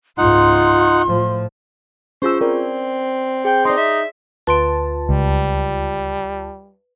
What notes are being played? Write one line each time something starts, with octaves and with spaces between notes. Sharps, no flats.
C#2 G#2 D#4 F4 F#5 C6
A2 F3
C#4 F4 G#4 C5 C#6 E6
C4 A#4 D5
G#4 G5
D#4 D5 C6
E5
D2 F4 B4 A5 C6 D7
C#2 G3